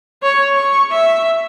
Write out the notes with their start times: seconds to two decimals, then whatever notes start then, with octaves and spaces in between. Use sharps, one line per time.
0.23 C#5
0.55 C#6
0.92 E5